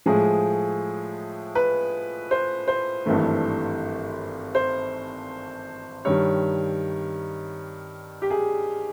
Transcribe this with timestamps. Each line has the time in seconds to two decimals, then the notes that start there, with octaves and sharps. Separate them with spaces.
0.06 A2 F3 G#3 G#4
1.55 B4
2.31 C5
2.68 C5
3.06 G#1 G2 E3 A3
4.55 C5
6.05 G2 D#3 G3 C#5
8.22 G4
8.30 G#4